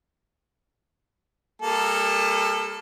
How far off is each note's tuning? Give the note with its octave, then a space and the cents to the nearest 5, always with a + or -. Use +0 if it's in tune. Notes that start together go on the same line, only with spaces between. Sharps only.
G3 +45 A#3 +0 A4 +0